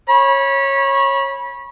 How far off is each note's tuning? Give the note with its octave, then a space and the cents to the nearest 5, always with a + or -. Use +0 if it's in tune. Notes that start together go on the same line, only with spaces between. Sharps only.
C#5 -20 B5 -30